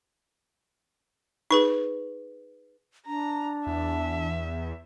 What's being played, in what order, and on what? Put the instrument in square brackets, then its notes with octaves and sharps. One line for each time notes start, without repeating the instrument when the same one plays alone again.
[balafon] D#4 [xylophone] G#4 B4 C#6
[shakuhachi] D4 [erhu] A#5
[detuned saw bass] E2 [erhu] E5